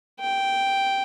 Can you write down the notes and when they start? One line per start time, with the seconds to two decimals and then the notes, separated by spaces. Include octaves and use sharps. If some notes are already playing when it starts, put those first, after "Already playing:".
0.21 G5